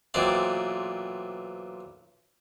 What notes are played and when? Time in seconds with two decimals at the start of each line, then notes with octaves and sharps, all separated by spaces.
0.14 B1 A#2 E3 C4 D5